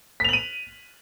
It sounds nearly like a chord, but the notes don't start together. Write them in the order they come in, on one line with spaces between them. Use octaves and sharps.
B6 F7 F#7 D#7